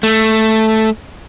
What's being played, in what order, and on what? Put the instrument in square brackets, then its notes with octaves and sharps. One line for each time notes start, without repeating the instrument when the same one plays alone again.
[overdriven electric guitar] A3